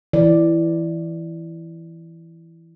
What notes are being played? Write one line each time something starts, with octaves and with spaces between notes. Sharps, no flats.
E3 D5